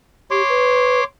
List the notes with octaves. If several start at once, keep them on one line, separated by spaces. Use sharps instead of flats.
G4 C#5 C6 D6
B4